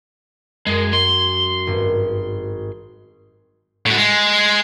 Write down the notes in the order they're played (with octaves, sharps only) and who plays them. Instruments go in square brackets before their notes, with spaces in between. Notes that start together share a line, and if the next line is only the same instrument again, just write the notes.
[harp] F#2 [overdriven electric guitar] G#3
[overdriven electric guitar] C6
[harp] G#1 G2
[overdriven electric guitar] A2 F#4
G#3